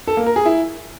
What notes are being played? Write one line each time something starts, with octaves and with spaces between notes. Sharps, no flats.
A4
A#3
A#4
G#4
E4